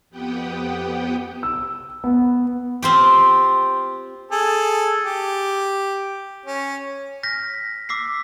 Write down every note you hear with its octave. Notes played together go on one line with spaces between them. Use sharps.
F2 B3 G4 F#5 G5 D#6
E6
B3
C4 F4 G4
G#4 A4
G4
C#4
F6 G6 A#6 B6
D6 E6 B6 C7